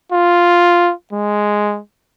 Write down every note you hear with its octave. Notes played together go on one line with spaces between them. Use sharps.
F4
G#3